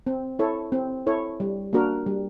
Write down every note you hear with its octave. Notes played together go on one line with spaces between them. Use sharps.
C4
E4 A4 C#5
C4
E4 A4 C#5
G3
A#3 D4 F#4 A#4
G3